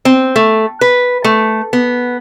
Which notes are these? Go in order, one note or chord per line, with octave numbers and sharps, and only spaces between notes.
C4
A3
B4
A3
B3